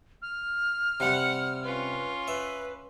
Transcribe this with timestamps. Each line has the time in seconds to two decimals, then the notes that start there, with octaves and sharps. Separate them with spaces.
0.22 F6
1.00 C3 G3 F#5
1.64 C#4 F4 B4
2.28 B4 E5